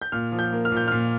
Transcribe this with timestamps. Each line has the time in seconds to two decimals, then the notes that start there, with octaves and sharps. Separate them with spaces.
0.02 G6
0.12 A#2 F6
0.32 F3
0.39 G6
0.52 A#3
0.65 F6
0.72 A#2
0.77 G6
0.88 A#2 F6